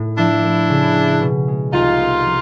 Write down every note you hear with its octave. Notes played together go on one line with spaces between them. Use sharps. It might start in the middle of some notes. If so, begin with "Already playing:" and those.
Already playing: A2
F3 D4 E4
A3
C#3
C#4
B2
G#3
C2 D#4 F4
B3
F3